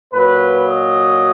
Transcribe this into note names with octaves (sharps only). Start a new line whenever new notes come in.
A#2 F#3 B4
D#5